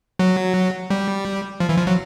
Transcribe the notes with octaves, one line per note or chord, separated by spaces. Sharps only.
F#3
G3
F3
E3
F3
F#3